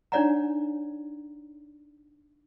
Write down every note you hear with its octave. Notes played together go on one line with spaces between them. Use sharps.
D4 D#4 C#5 D5 F#5 A#5